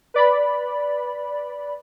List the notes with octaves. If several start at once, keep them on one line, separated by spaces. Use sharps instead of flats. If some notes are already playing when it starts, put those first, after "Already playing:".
B4 D5 B5